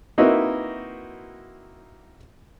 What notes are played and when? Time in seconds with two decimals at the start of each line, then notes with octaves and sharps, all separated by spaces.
0.18 A#3 C4 D#4 E4 F#4 B4